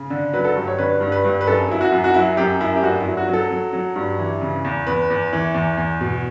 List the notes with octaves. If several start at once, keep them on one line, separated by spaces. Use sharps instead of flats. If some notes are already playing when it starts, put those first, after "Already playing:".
Already playing: C#3
D3
F#3 B4
A4
G2
C#5
D3 B4
G2
B4
G2
B4
F#2 A4
F#3 E4
F#4
F#2
F#4
F#3 E4
F#2 G4
F#2 E4
G4
G2 F#4
E4
F#3
F#4
F#3
A4
F#3
F#3
G2
E3
C#3
E2
E2 B4
E2
E3
E2
E2
B2